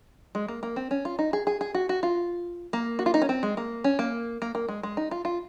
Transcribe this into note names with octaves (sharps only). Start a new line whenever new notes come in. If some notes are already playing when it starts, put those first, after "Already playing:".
G#3
A#3
A#3
C4
C#4
F4
D#4
G#4
G#4
G#4
F#4
F#4
F4
A#3
F#4
F4
D#4
C#4
C4
G#3
A#3
C#4
A#3
A#3
A#3
G#3
G#3
D#4
F4
F4